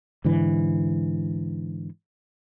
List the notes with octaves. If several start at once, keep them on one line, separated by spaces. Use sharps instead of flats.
G#2 D3 E3